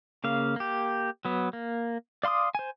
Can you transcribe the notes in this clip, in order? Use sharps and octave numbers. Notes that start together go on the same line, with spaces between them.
C#3 A#3 F5
A#3 G4
F#3 B3
A#3
D5 F5 C6 D6 D#6
C5 G#5